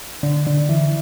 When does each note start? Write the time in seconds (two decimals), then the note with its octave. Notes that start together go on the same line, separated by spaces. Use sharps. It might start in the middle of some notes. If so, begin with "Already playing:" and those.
0.23 D3
0.46 D3
0.69 E3